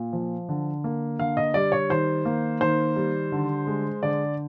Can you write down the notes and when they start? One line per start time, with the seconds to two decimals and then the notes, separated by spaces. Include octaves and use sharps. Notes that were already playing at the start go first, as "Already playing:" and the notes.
Already playing: A#2
0.13 F3
0.49 D3
0.84 A#3
1.19 D3 F5
1.37 D#5
1.54 G3 D5
1.72 C#5
1.90 D#3 C5
2.25 A#3
2.61 D#3 C5
2.96 G3
3.32 D3
3.67 G#3
4.03 D3 D5